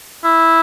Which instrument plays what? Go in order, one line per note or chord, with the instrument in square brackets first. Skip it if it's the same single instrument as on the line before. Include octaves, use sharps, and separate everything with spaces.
[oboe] E4